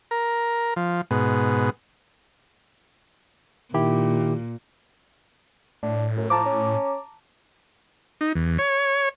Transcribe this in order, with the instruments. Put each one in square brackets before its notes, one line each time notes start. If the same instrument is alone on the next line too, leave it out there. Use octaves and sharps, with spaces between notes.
[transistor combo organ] A#4
F3
G#2 B2
[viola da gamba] A#2 [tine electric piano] D#3 E4 G4
[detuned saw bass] A2 [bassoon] D4
[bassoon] F#2
[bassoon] F3 [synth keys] A5 A#5 D6
[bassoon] C#4
[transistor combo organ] D#4
E2
C#5